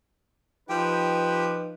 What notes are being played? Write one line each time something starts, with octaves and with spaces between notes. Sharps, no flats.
F3 D#4 G4 B4 G5